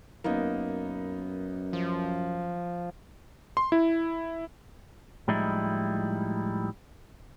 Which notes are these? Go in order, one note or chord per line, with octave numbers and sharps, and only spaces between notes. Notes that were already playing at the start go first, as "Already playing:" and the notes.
F#2 A#3 B3 D#4
F3
C6
E4
A2 F3 G3 G#3 D#4 E4